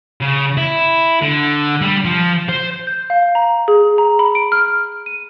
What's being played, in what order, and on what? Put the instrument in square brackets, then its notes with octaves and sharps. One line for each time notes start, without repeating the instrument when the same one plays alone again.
[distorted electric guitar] C#3
E4
D3
G3
F3
C5
[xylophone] G6
F5
A#5
G#4
A#5
B5
D7
F6
D#7